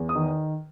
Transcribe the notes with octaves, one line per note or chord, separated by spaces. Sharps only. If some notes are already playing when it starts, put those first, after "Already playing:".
Already playing: E2
D#6
D#3